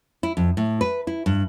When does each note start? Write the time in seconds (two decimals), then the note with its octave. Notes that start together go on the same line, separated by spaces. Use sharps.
0.23 E4
0.37 F2
0.57 A2
0.81 B4
1.07 E4
1.26 G2